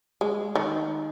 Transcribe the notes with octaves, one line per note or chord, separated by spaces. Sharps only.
G#3
D#3